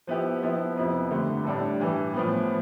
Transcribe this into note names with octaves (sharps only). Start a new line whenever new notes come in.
F3 B3 E4 G4
F3 B3 E4
F2 C3 F3 B3 E4
G2 D3 A3
A2 G3 D4 A4
G2 E3 G3
A2 F3 B3